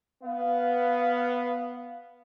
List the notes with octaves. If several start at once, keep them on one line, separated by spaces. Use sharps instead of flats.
B3 F5